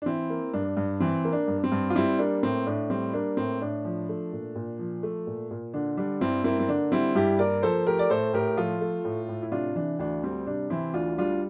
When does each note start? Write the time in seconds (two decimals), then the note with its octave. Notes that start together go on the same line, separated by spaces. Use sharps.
0.02 D4
0.06 E3 C4 E4
0.30 A#3
0.53 G2 D4
0.77 G2
1.00 E3 C4
1.25 A#3
1.33 D4
1.48 G2
1.64 C4
1.72 G2
1.90 F4
1.95 G3 C4 E4
2.19 A#3 D4
2.43 A2 C4
2.66 A2 D4
2.90 G3 C4
3.13 A#3 D4
3.37 A2 C4
3.61 A2 D4
3.85 F3
4.09 A3
4.33 A#2
4.55 A#2
4.79 F3
5.03 A3
5.27 A#2
5.51 A#2
5.74 D3 D4
5.97 G3 D4
6.21 G2 C4 E4
6.44 A#3 C4 E4
6.59 C4
6.69 D3 D4
6.92 G3 C4 E4
7.15 G2 E4 G4
7.39 A#3 A#4 D5
7.63 F3 A4 C5
7.87 A3 G4 A#4
7.99 D5
8.10 A2 A4 C5
8.33 A2 G4 A#4
8.57 F3 F4 A4
8.81 A3
9.05 A2
9.29 A2
9.42 E4
9.52 C3 D4 F4
9.76 E3 D4
9.99 D2 D4
10.23 G3 C4
10.47 C3 D4
10.70 E3 C4 E4
10.94 D2 D4 F4
11.18 G3 D4 F4